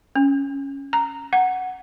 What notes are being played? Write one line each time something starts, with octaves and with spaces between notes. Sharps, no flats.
C#4
A#5
F#5